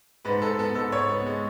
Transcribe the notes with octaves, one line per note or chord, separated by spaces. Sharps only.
G#2 B4
G#2 A4
B3 A4
G#2 A4
G#2 C#5
B3
G#3